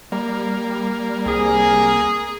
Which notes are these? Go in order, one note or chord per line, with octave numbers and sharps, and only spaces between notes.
G3 A#3
C2 G#4